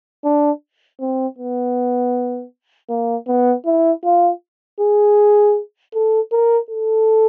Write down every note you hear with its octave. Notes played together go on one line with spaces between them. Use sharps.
D4
C4
B3
A#3
B3
E4
F4
G#4
A4
A#4
A4